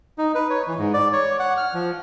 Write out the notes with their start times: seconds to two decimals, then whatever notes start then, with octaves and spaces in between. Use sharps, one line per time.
0.18 D#4
0.35 B4
0.50 C#5
0.67 E3
0.79 G#2
0.94 D5
1.13 C#5
1.39 F#5
1.57 F6
1.74 F3